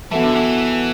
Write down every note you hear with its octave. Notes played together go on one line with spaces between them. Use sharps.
E3 B3 F#4 A4 E5 A5
D3
E3